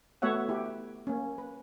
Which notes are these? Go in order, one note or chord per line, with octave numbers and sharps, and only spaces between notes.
A3 B3 F#4 C#5 E5 F#5
E4 G4
A#3 C#4
B4